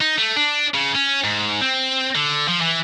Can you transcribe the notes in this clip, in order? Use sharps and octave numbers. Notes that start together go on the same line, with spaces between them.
D#4
A3
D4
C#3
C#4
G#2
C4
D3
F3
E3